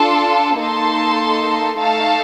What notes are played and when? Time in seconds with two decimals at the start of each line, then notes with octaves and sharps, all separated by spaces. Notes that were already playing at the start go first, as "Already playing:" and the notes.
Already playing: D4 F4 A4 A5 C6
0.58 A#3 D#4 A4 A5 C6
1.78 A3 D#4 A4 F5 A5